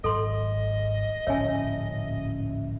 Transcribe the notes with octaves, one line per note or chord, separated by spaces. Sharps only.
G#1 F#3 A4 D#5 C6
D1 A#1 G#2 C#4 C#5 E5 G#5